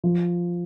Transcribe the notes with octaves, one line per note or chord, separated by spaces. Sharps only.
F3